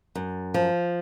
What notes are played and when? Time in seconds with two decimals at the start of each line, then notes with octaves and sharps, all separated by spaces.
0.15 F#2
0.54 F3